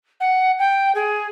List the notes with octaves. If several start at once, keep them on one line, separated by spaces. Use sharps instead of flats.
F#5
G5
G#4